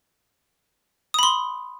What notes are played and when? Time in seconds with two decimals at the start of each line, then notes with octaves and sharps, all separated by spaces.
1.14 D#6
1.19 B5
1.23 C6